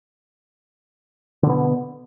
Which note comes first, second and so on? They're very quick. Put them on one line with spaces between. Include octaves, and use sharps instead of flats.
D3 B2 B3